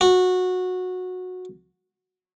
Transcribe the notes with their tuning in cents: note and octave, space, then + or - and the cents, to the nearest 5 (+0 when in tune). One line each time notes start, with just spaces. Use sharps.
F#4 -15